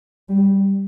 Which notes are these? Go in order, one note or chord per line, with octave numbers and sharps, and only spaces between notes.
G3